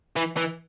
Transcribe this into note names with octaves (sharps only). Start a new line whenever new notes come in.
E3
E3